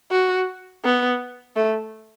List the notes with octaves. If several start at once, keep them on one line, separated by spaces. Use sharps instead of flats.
F#4
B3
A3